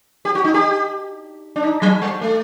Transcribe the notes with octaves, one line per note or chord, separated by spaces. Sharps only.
G4
F#4
D#4
G4
D4
D#4
F#3
G3
A3